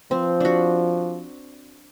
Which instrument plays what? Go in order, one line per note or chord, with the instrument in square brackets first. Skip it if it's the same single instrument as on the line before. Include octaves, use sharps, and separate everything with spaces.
[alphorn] F3 [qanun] C4
[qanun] D4 F#4